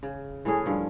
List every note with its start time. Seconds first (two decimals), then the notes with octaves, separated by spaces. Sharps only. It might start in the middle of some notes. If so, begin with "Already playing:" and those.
0.03 C#3
0.45 E3 A3 C#4 G#4
0.66 G2 F3